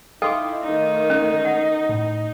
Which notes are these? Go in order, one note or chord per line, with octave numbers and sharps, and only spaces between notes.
D#4 E4 A4 D#5 F5 G5 C6 D6
D#3 A3 D#4
C#4
F#5
A2